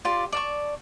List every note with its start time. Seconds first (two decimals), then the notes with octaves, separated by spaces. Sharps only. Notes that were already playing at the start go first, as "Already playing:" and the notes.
0.05 F4 G4 D5 C6
0.32 D5 A5 C#6